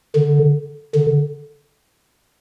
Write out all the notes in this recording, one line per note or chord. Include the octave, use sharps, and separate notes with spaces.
D3
D3